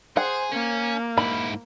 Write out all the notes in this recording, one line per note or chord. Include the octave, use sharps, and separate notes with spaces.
G#4 C5 F#5
A#3 C#4
G#2 E4 B5